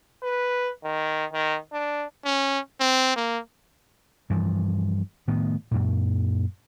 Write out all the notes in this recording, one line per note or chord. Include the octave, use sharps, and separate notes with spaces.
B4
D#3
D#3
D4
C#4
C4
A#3
G2 E3 F3
A2 D#3 B3
F#2 A#2